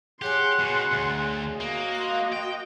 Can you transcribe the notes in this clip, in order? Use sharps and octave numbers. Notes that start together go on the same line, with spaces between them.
G4 G#4 C#5 F#5 G#5 C6
B2
D2
A#3 F#4 D#5
F5 C6
G5